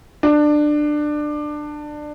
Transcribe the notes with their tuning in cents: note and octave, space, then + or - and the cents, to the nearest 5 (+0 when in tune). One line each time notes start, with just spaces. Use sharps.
D4 +20